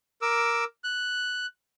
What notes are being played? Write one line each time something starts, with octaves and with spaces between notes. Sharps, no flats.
A#4 D6 E6
F#6